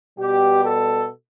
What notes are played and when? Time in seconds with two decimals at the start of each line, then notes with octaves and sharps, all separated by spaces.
0.19 B2 G3 B3 G4
0.64 A4